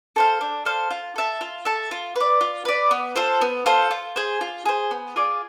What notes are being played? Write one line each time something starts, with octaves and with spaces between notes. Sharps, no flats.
A4 C5 F5
D4
A4 C5 F5
F4
A4 E5 A5
F4
A4 E5 A5
F4
B4 D5
F4
B4 D5
B3
F4 A4 C5
B3
F4 A4 C5
F4
G#4 C5
F4
G#4 C5
B3
F4 G#4 D5